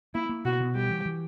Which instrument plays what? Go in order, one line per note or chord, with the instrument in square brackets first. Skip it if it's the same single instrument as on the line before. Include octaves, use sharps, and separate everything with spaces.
[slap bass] A#3 [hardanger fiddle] E4
[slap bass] A#3
[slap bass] B2 [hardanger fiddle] F#4
[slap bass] B2
[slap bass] G3 [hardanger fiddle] G4
[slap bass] E3
E3